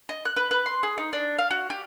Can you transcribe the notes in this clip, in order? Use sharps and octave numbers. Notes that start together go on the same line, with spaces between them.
D#5
F#6
B4
B4
C6
G#4
D#4
D4
F5
F#4
G4